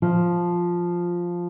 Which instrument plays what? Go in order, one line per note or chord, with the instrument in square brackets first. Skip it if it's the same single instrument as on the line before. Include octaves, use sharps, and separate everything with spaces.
[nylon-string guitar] F3